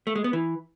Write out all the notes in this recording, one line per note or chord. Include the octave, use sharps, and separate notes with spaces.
A3
G#3
B3
E3